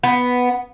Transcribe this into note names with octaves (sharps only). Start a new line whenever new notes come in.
B3